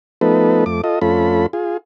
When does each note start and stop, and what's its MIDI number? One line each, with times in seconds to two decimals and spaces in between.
0.21 0.64 53
0.21 0.64 57
0.21 0.64 59
0.21 0.64 63
0.21 0.64 69
0.21 0.64 71
0.66 0.81 41
0.66 0.81 57
0.66 0.81 86
0.84 0.99 65
0.84 0.99 69
0.84 0.99 75
1.01 1.46 41
1.01 1.46 57
1.01 1.46 61
1.01 1.46 65
1.01 1.46 69
1.01 1.46 83
1.53 1.77 65
1.53 1.77 68